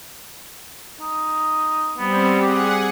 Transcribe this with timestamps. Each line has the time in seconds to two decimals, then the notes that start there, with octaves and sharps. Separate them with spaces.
1.00 D#4
1.98 G3 B3 C4
2.41 G4 G#4 F#5